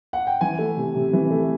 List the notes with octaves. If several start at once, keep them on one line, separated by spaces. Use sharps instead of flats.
F#5
G5
E3 G#5
A3
C3
C3
E3
A3